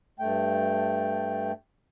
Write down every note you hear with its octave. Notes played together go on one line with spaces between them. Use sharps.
G2 A3 G5